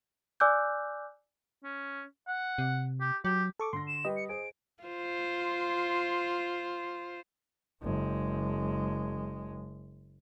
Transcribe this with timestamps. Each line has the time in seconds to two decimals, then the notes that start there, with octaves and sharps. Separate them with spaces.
0.40 D5 G#5 D6 E6 F#6 G6
1.64 C#4
2.28 F#5
2.58 C3
3.01 G4
3.25 F#3 G4
3.59 A4 C#6 D6
3.73 D3 C6 A#6
3.88 E7
4.05 G3 B4 D#5 G5
4.17 C#7
4.29 G#4 C5 D7
4.83 F4 C5
7.82 F#1 G#3